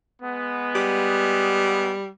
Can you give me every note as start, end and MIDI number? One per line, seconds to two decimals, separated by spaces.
0.22 1.95 56
0.22 1.95 59
0.75 2.08 55